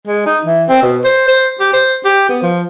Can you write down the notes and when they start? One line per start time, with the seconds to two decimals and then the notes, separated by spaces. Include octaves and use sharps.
0.07 G#3
0.26 D#4
0.45 E3
0.69 C4
0.83 B2
1.04 C5
1.28 C5
1.60 G4
1.73 C5
2.05 G4
2.29 B3
2.43 F3